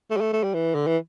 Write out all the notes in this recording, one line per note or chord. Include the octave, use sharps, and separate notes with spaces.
A3
G3
A3
A3
G3
E3
D3
E3